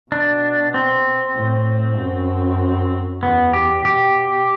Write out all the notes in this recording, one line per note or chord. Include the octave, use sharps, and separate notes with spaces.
B2 D4
C4
A2
F#2
E2 B3
G4
B2 G4